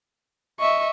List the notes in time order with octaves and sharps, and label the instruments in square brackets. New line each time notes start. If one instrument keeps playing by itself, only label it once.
[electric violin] D#5 E5 [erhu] C#6